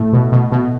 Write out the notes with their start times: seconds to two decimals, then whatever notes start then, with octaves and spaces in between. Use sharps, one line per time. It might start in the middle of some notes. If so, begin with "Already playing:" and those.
Already playing: A2 A3
0.13 B2
0.32 B2
0.52 B2